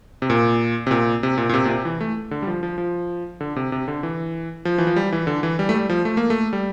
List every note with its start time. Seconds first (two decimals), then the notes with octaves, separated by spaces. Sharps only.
0.22 C3
0.30 A#2
0.87 C3
0.91 A#2
1.23 C3
1.38 A#2
1.49 A#2
1.54 C3
1.65 A#2
1.69 C3
1.85 E3
2.01 A3
2.31 D3
2.42 G3
2.47 F3
2.63 F3
2.78 F3
3.41 D3
3.56 C3
3.72 C3
3.88 D3
4.03 E3
4.65 F3
4.78 E3
4.87 F3
4.96 G3
5.12 E3
5.27 D3
5.43 E3
5.59 G3
5.69 A3
5.74 G3
5.89 F3
6.05 A3
6.17 A#3
6.30 A3
6.53 G3